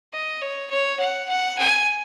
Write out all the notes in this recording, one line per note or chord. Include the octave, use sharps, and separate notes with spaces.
D#5
C#5
C#5
F#5
F#5
G#5